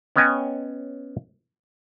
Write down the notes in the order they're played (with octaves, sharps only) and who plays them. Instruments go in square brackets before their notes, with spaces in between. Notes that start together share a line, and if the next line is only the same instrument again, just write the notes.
[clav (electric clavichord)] B3 C#4 C#5 D#5 G5 G#5